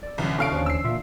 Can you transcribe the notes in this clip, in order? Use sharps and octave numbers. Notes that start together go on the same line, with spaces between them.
D5 E6
C2 F#2 D3 E3
B2 C#4 E4 A4 F5 D7
D#2 C#4 D4 C5
E6 C7
A#2 F4 E5 F5